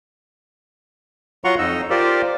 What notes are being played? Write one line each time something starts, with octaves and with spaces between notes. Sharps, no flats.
F#3 F4 F#5 A#5 C6 C#6
F2 D#4 D#5 E6
F4 G4 A#4 C5 D5